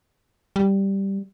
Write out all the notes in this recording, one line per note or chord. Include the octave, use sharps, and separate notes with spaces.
G3